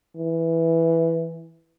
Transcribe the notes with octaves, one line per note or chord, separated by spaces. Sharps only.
E3